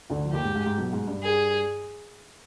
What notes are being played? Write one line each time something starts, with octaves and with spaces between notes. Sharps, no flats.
D2 D3
F3
D#2 D#3 G4
G#2
G#2
G#2
B1 B2
G#2
G2
G#4